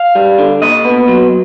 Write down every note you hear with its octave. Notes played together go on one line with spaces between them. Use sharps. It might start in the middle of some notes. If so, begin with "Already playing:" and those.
Already playing: F5
G3
D3
A#2 D#5
B3
F#3